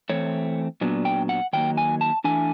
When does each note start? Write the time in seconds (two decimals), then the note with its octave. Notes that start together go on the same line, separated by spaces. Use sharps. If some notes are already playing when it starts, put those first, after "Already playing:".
0.09 E3 A3 C4 C#5
0.81 A#2 F#3 B3 D4
1.05 G5
1.29 F#5
1.53 D#3 F#3 A#3 G5
1.77 G#5
2.01 A5
2.24 E3 A3 D4 G#5